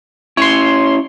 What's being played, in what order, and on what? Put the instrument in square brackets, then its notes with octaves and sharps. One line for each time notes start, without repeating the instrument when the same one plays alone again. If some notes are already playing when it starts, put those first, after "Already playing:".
[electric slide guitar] C#4 E4 [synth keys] C#5 C6